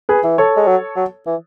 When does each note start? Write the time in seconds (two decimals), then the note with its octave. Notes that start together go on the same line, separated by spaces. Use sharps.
0.09 G#4 B4
0.24 E3
0.38 A4 C#5
0.57 G#3
0.68 F#3
0.96 F#3
1.26 E3